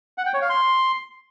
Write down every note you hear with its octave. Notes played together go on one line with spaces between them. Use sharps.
F#5
G5
C#5
F5
C6